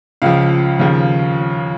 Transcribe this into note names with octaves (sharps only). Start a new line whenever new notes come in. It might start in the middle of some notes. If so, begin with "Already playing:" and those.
C#2 C#3 F3 F5
D#2 C#3 F3